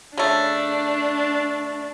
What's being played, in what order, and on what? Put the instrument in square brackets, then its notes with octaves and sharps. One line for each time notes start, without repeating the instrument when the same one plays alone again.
[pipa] C#3 A3 [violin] D4